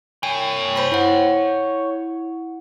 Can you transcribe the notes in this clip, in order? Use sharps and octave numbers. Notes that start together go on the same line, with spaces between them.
C#5 G5 G#5
C5 B5 C6
E4 F#5